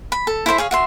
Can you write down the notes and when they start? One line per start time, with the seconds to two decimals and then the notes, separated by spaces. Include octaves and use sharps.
0.12 B5
0.27 A4
0.46 E4 A4 C5 E5
0.58 G#4 C#5 F5
0.71 F#4 E5 C6